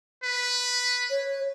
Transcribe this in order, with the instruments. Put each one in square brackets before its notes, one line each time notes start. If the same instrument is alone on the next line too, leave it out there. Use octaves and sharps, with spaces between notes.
[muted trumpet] B4
[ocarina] C#5